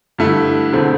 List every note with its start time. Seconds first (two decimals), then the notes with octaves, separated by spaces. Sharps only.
0.18 G2 D3 A3 E4
0.73 E1 D3 A3 C4